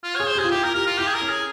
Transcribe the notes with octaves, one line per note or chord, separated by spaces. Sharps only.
F4
G#4 C#5
C5
G4 G#4
F4
E4 G4
F4 A#4
G4 A#4
F4
E4 G4
G#4
A#4
C#4
G#4